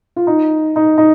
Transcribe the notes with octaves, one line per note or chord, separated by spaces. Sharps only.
F4
D#4
D#4
D#4